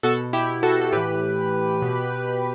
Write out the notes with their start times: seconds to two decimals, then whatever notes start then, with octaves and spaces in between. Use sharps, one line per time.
0.03 B2 F#4 A4
0.33 E4 G4
0.63 F#4 A4
0.81 A4
0.92 A2 E3 G4 B4
1.82 B2